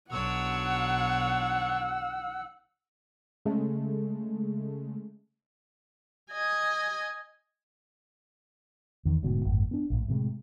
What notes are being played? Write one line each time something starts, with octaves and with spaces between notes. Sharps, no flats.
B1 D4 C#5 F#5 E6
C#3 G#3 A3
D#5 G#5
E2 D#3
D1 D2 G#2 B2
G#1 F#2 A2
B3 D4
A#1 A2
A2 C3 G3 G#3